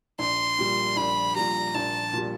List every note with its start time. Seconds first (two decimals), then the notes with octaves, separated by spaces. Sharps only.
0.19 A#1 C6
0.58 A#2 G3
0.96 A#1 B5
1.36 A#2 G3 A#5
1.74 A#1 A5
2.13 A#2 G3